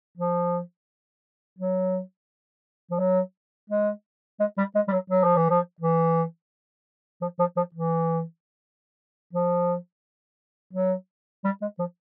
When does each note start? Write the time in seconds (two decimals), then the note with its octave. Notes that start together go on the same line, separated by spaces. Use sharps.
0.17 F3
1.59 F#3
2.91 F3
2.99 F#3
3.70 G#3
4.40 G#3
4.58 G3
4.75 G#3
4.88 G3
4.92 F#3
5.10 F#3
5.24 F3
5.36 E3
5.50 F3
5.81 E3
7.22 F3
7.39 F3
7.56 F3
7.74 E3
9.33 F3
10.73 F#3
11.45 G3
11.62 G#3
11.79 F3